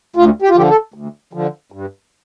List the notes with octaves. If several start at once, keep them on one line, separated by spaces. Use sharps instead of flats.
D2 F4
G4
F4
D3 F3 G4
A4
D2
D3 F3
G2